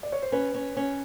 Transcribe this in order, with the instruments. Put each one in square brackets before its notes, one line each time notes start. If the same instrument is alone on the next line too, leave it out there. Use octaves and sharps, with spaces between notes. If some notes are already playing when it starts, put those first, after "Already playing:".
[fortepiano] D5
C#5
C5
[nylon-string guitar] C#4 [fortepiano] B4
[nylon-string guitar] C#4
C#4